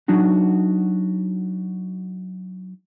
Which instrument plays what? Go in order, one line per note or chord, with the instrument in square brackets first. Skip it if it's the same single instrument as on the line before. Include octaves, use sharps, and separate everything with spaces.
[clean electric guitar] F#3 D4 D#4 F#4